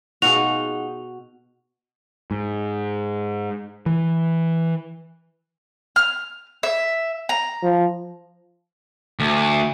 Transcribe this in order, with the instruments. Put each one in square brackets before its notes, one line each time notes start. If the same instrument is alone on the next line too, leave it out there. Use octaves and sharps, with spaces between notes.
[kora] B2 F#4 [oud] D#4 F4 G#4 [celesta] F7
[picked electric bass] G#2
E3
[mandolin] F6
E5
A#5
[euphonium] F3
[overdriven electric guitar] D2